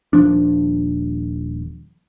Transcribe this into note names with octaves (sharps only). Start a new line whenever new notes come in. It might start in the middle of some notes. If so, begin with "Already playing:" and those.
D#1 F3 D4